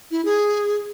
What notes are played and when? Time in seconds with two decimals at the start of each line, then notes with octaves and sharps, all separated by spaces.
0.11 E4
0.25 G#4